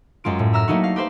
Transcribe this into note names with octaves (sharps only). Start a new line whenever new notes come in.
F#2 G#3 F4 D7
A2
E5 A#5 E6 F6
F#3 A3 A#3 D#4 E4 F#4
F5
G4 B4 C5 F5